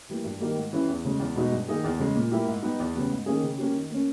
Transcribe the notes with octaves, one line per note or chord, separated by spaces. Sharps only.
E3 G3 A#3
G2
D#3 G3 A#3
G#2
E3 G3 C#4 E4
E2
C#3 G#3
E2
B2 G#3 D#4
G2
D#3 A#3 D#4 G#4
E2
C#3 G#3
A#2
G3 A#3 E4 G4
G#2
G3 B3 D#4 G4
E2
C#3 G3 B3
G#2
D#3 A#3 C#4 G#4
C#3
G3 A#3 C#4 G4
D#3
A#3 C#4